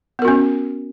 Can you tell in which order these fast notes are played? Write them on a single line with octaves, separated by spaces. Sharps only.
B3 A#4 F#4 C#4